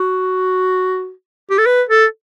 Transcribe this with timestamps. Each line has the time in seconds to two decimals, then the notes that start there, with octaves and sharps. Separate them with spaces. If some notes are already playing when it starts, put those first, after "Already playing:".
Already playing: F#4
1.50 G4
1.58 A4
1.66 B4
1.89 A4